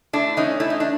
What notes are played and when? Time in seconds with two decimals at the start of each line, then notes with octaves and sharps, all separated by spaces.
0.13 A3 D4 E4
0.37 E3 C#4 D#4
0.60 A3 E4
0.70 D#4
0.80 D4